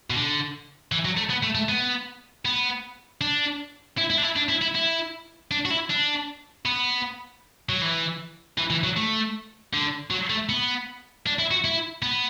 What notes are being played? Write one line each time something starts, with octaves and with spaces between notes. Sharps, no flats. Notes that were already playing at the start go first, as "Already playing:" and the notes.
B2
D3
E3
F#3
A3
B3
A3
A3
B3
B3
D4
E4
E4
D4
E4
D4
E4
E4
E4
D4
F#4
E4
D4
B3
F#3
E3
E3
E3
F#3
A3
D3
F#3
A3
B3
D4
E4
F#4
E4
B3